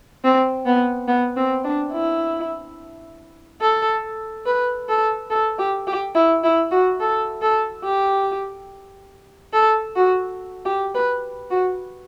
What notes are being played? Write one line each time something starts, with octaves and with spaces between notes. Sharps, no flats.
C4
B3
B3
C4
D4
E4
A4
B4
A4
A4
G4
G4
E4
E4
F#4
A4
A4
G4
A4
F#4
G4
B4
F#4